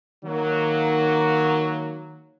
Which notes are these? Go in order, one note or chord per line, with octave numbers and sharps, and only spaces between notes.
D#3 F#3 A#3